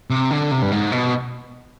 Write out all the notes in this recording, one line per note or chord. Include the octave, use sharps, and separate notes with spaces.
C3
D3
C3
G2
G#2
B2